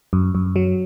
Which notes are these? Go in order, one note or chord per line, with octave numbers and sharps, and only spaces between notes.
F#2
F#2
F#3